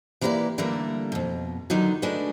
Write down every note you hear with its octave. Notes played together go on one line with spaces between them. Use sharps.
E3 A#3 E4 G4 B4 D5
D3 E3 G3 A3 A#3 A#4
F2 B2
D3 D#3 F#3 B3 D#4
G#3 A3 D4 F#4 B4